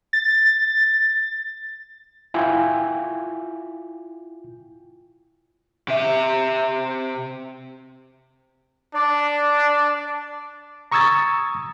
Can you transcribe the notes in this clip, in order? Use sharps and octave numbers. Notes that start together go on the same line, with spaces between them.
A6
E4 F4 G5 G#5
C3 E5
D4 D5
A#5 C#6 D#6 E6 G#6 A6